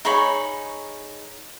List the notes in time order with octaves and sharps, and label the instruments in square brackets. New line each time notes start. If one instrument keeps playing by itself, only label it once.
[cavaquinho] D#4 G#4 C#5 B5